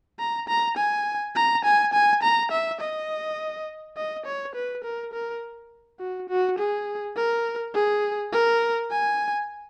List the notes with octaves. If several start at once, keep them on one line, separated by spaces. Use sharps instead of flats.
A#5
A#5
G#5
A#5
G#5
G#5
A#5
E5
D#5
D#5
C#5
B4
A#4
A#4
F#4
F#4
G#4
A#4
G#4
A#4
G#5